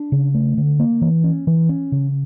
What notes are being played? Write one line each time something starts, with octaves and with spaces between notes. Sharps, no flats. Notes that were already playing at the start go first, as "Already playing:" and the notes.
Already playing: D4
C#3
A3
D3
A#3
E3
C#4
E3
C#4
C#3